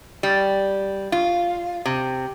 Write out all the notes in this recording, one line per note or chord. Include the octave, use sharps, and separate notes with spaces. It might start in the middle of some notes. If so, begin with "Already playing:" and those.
G3
F4
C3